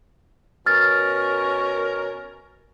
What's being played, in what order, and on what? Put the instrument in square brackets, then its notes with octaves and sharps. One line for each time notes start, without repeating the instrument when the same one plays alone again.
[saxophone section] B2 C#4 A#4 [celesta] F6 A6